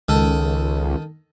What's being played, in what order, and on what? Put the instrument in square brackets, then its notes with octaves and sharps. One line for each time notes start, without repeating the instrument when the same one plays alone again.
[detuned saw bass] C#2 [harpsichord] D#3 A4